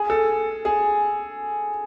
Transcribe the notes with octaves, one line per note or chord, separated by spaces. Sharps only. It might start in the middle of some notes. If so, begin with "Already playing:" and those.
Already playing: G#4
A4
G#4